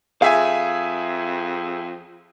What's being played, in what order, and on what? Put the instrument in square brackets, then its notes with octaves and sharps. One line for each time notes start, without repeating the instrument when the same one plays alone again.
[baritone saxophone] F2 [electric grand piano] G#4 E5 G#5 [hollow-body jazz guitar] F5